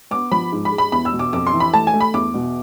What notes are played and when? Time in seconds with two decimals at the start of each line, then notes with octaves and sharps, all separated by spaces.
0.11 B3 D6
0.32 F3 B5
0.52 G#2
0.65 B5
0.72 G#3
0.78 B5
0.92 E2 B5
1.05 E6
1.13 B2
1.19 D6
1.33 F2 D6
1.47 C6
1.53 E3
1.60 B5
1.73 A3 A5
1.87 G#5
1.94 A3
2.01 B5
2.14 E2 D6
2.34 B2